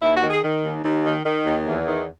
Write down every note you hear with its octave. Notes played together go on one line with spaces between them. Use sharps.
D#2 E4
F#4
D#3
G#4
D#3
D#2
D#2
D#3
D#3
D#2
E2
D#3